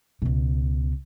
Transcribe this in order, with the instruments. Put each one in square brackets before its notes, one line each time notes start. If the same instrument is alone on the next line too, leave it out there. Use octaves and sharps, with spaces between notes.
[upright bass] C#2 B2